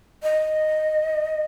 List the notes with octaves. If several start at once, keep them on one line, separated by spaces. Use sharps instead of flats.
D#5